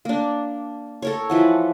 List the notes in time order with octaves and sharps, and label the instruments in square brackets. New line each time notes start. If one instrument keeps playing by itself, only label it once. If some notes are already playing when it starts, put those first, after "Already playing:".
[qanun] A#3 D4
A4 A#4 C#5
E3 F3 F#5